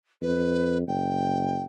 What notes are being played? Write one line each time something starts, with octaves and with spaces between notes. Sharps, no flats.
F2 B4
F#1 G5